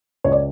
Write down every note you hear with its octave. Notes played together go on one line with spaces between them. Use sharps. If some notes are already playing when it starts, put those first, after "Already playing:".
C#2 C#5
D5